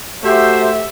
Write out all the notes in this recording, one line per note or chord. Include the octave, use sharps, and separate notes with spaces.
A3 F#4 G4 C5 E5